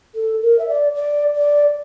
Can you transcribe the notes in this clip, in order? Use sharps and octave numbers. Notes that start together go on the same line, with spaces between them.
A4
A#4
E5
D5
D5
D5